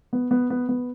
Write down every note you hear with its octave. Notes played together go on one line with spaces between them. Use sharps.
B3
B3
B3
B3